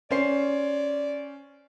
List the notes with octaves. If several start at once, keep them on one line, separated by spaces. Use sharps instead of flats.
C#4 C5 D5 C7